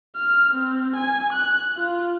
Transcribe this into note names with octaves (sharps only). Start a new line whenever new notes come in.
F6
C4
G#5
F#6
F4